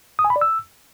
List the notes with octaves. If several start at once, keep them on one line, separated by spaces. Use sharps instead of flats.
D#6
G#5
B5
D5
E6